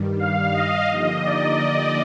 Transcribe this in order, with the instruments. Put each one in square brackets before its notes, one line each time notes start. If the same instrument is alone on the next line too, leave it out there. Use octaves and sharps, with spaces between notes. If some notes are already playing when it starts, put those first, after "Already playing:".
Already playing: [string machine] G2 D#3 G3
[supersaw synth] F5
D#5
[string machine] D3 F3 A#3 D#4 G4 [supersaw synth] D#5
[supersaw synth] D5